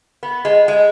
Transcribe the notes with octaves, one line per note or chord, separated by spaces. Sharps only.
B3
G#3
G#3